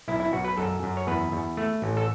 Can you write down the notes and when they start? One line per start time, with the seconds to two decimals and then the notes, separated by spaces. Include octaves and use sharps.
0.08 B1 E4
0.20 E4
0.33 B1 F#4
0.45 B4
0.57 F#2 A4
0.83 F#2
0.97 C#5
1.07 E2 B4
1.32 E2
1.57 A3
1.82 A1
1.97 A4